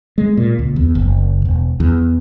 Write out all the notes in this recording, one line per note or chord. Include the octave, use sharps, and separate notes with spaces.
G#3
A#2
C#2
E2
F#1
E1
E2